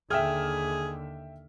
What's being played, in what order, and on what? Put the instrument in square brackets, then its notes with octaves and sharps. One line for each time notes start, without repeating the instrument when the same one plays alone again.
[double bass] D#2 D3 [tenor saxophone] G#4 [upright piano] E5 G5 F6